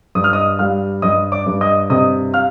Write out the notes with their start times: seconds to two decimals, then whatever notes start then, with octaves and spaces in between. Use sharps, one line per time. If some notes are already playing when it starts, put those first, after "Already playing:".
0.15 G2 D#6
0.24 F6
0.33 D#5 D#6
0.59 G3 F5 F6
1.02 G2 D#5 D#6
1.32 D5 D6
1.46 G2
1.61 D#5 D#6
1.90 C3 D#5 D#6
2.34 F5 F6